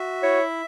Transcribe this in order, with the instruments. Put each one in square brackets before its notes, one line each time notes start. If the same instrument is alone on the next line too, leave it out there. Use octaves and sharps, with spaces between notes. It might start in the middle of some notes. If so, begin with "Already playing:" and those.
Already playing: [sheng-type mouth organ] F#4 E5
[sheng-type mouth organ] E4 [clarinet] C#5